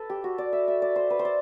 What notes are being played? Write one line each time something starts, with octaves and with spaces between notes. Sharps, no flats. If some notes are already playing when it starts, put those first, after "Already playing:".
Already playing: A4 B4
G4
F#4
D5
E5
E5
D5
C5
B4
C5
D5